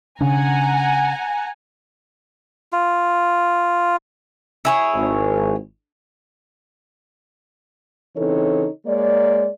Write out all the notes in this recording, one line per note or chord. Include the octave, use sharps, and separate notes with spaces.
C#3 C#4 D4 F#5 G#5 A#5
F4
E4 G#4 C#5
G#1
C#3 E3 C4 D#4 A4 C#5
G#3 A#3 C#5 D5